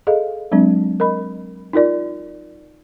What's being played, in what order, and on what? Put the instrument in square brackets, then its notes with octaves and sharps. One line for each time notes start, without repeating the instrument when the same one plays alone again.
[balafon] G#4 A4 D#5 F5
F#3 G#3 C4 D4
A#4 D#5 B5
D#4 F4 A#4 D5